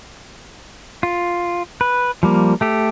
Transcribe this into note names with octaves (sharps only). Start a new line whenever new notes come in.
F4
B4
F3 G3 A#3
A3 G4 A4